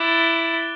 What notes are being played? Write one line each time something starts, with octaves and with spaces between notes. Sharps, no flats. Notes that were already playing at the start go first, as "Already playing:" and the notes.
Already playing: E4 D6 F#6 A6 D7 G7